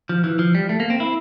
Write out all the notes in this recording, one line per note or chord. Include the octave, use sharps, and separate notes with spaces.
F3
E3
F3
G3
A3
A#3
C4
E4